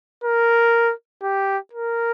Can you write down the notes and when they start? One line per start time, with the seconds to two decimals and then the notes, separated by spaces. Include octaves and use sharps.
0.24 A#4
1.23 G4
1.73 A#4